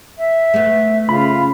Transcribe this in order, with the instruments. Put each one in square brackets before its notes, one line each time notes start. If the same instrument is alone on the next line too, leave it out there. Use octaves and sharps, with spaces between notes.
[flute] E5
[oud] A3 B3
[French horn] C#3 [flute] F4 [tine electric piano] B5